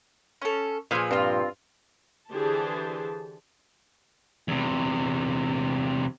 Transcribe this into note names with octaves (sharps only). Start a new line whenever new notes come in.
C#4 A4
A#2 F3 G#4 B4
G2 C4 F4
D3 E3 G4 G#4 C5 A5
E2 C3